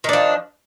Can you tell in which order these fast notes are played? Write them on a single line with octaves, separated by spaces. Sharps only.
D#3 D4 F3